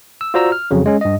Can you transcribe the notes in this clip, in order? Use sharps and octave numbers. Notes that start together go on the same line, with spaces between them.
E6
F4 F#4 C5 D5 A#5 E6
F6
F2 C#3 F#3
G#3 C#4
G2 D#5